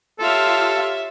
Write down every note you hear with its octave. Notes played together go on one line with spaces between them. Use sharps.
F4 G4 A4 C#5 E5 F5